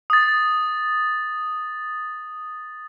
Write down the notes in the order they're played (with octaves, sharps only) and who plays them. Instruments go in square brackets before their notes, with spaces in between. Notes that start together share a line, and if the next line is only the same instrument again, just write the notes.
[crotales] D#6 A6